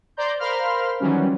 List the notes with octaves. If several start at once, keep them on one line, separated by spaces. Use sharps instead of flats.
C5 D5 A#5 C6 G6
A#4 C5 F5 B5 C6 F6
D#3 E3 F#3 G3 C#4